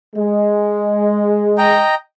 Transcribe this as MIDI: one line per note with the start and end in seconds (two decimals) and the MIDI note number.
0.16 1.80 56
1.58 1.95 75
1.58 1.95 79
1.58 1.95 82